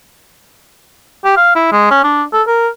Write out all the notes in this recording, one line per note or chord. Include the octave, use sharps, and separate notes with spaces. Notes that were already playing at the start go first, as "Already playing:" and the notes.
G4
F5
E4
G#3
C#4
D4
A4
A#4